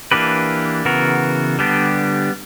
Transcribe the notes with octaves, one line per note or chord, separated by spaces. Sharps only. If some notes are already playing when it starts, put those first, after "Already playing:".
E3 A#3 D4 G4 B4
C#3 E3 B3 F#4 A#4
D3 G3 B3 D4 G4